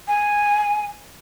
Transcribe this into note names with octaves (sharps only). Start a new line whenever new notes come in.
G#5